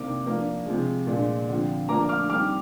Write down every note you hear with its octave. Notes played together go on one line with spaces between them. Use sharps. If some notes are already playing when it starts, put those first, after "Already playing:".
Already playing: C3 D#3 A#3 D4 D6
F3 A#3 D4
C3 F3 G#3
A#2 G#3 D4
D3 F3 C4
F3 A#3 D4 A#5 D6
D6 F6
D#3 G3 C4 D6 F6